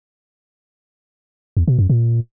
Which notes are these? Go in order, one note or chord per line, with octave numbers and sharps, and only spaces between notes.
E2
B2
F#2
A#2